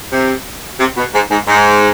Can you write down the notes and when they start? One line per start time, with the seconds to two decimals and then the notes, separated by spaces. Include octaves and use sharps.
0.12 C3
0.80 C3
0.97 B2
1.14 G#2
1.31 G#2
1.48 G#2